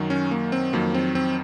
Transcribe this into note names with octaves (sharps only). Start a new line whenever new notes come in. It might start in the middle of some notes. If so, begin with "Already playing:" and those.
Already playing: F#2 D#3 F#3
C#4
A#3
C4
F2 D#3 F#3 A#3
C4
C4